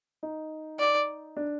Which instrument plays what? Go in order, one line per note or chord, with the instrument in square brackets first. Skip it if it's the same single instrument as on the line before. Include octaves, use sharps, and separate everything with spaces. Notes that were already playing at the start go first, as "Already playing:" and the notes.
[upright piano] D#4
[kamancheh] D5
[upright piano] D4